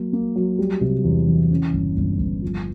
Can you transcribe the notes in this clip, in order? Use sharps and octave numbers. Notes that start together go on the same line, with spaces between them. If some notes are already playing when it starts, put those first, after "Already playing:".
Already playing: F#3 A#3
A#3
F#3
G3
C3
E2
E3
C#3
G1
G1
G1
F3